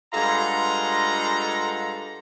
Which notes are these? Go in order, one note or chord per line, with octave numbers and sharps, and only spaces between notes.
G2 G#3 F4 A4 F#5 A#5